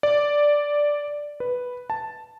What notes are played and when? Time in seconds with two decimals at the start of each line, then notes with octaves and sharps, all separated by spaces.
0.03 D5
1.40 B4
1.90 A5